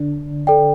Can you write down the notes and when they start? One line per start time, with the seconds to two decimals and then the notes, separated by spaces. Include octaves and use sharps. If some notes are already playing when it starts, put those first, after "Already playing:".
Already playing: D3 D4
0.47 A4 D5 G5